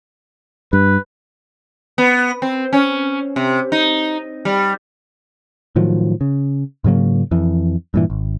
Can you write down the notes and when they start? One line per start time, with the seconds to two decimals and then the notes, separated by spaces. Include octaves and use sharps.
0.73 G2 B4
1.98 B3
2.42 C4
2.73 C#4
3.36 C3
3.72 D#4
4.45 G3
5.76 A2 D#3 F3 F#3
6.21 C#3
6.84 G#2 C#3 F#3 A#3
7.31 F2 E3
7.94 G2 A#2 E3
8.10 G#1